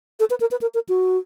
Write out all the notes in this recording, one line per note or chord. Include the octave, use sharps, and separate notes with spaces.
A4
B4
A#4
B4
A#4
A#4
F#4